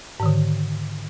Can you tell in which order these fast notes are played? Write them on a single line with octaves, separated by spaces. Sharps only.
G#2 D#3 D3